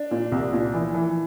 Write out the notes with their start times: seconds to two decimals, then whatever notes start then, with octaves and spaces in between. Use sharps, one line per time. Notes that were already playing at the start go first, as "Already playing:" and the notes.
Already playing: D4
0.11 A#2
0.32 C2
0.53 A#2
0.74 E3
0.94 E3